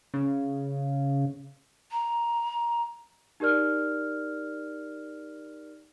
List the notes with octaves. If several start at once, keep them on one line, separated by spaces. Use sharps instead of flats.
C#3
A#5
D#4 G4 A#4 D5 F6